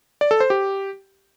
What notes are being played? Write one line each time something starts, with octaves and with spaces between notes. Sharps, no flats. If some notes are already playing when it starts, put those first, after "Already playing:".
D5
A4
C5
G4